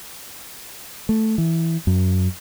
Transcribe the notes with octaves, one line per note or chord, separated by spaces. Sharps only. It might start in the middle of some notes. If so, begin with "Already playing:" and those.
A3
E3
F#2